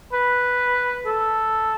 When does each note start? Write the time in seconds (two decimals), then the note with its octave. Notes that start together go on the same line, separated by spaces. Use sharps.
0.13 B4
1.06 A4